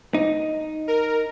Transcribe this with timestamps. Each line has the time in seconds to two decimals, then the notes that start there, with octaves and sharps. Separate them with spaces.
0.14 D#4
0.88 A#4